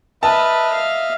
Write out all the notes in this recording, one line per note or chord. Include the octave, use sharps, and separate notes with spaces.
B4 D#5 E5 A5 F6
F5